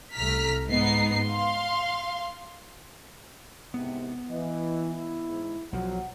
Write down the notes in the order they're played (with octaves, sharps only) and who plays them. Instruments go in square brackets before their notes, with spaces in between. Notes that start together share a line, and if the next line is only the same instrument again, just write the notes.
[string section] C2 A3 A#5 F6 B6
G#2 B3 D#4 C7
F5 C6
[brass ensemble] C2 G#2 C3 [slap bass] B3
[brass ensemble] E3 [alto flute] D#5
[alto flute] E4
[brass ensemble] G#2
[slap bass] B1 F3 [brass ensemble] F#3 [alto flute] F#5